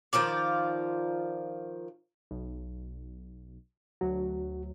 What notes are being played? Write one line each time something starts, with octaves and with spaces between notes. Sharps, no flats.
D#3 F3 F4 D5
B1
D2 F#3 F#4